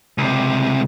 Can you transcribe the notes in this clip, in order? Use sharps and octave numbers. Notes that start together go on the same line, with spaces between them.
C#2 C3